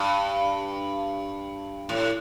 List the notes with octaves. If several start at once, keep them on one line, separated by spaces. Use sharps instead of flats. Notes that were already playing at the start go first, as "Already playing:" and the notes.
Already playing: G2
A2